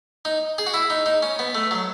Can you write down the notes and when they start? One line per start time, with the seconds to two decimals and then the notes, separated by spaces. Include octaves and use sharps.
0.25 D#4
0.58 G#4
0.67 F#4
0.74 E4
0.90 D#4
1.06 D#4
1.23 C#4
1.39 B3
1.55 A3
1.71 F#3